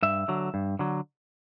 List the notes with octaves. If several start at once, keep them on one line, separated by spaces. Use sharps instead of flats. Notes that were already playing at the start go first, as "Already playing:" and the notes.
G2 E5
D3 F#3
G2
D3 F#3